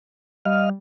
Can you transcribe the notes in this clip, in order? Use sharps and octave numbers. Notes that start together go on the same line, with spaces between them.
G3 D#5 F5 F6